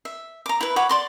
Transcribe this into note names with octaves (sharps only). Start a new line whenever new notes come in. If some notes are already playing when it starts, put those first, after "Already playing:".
E5
A#5 D6
E4 B4
C#5 F#5 B5 D6
D5 C6 D6